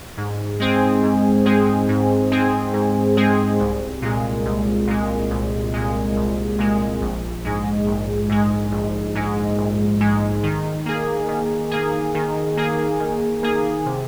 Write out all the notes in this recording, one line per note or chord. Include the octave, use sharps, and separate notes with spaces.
G#2
G#3 C4 G#4
G#2
G#3 C4 G#4
G#2
G#3 C4 G#4
G#2
G#3 C4 G#4
C2
A#2 G#3
C2
A#2 G#3
C2
A#2 G#3
C2
A#2 G#3
A#1
G#2 G#3
A#1
G#2 G#3
A#1
G#2 G#3
A#1
G#2 G#3
D#3
A#3 G#4
D#3
A#3 G#4
D#3
A#3 G#4
D#3
A#3 G#4
C3